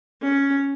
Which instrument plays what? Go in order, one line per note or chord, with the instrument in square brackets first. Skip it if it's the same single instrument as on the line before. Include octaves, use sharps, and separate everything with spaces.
[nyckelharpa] C#4